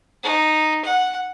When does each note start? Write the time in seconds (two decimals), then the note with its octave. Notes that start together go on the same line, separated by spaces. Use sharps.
0.23 D#4
0.85 F#5